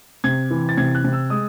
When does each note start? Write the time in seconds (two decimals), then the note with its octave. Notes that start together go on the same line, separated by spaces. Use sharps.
0.24 C3 G#6
0.50 E3
0.69 A6
0.77 C3 G#6
0.95 F#6
1.04 C3
1.13 E6
1.30 G#3 D#6